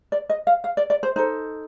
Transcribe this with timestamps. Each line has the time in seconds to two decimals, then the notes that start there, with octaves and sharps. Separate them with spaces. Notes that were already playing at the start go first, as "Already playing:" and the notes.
0.12 D5
0.29 D#5
0.47 F5
0.64 F5
0.77 D5
0.90 D5
1.03 C5
1.16 D#4 A4 C5